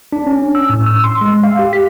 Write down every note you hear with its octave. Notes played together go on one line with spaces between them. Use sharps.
D4
C#4
E6
A2
E6
C6
G#3
F5
G4
B6